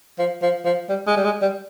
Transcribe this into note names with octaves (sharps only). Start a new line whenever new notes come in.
F3
F3
F3
G3
G#3
G3
G#3
G3